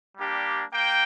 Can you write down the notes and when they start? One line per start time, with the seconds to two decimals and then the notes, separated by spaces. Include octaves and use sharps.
0.18 G3 A#3 D4 G4
0.74 A#3 G5